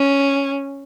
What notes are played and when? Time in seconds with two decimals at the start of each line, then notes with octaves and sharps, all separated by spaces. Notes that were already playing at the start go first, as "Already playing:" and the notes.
Already playing: C#4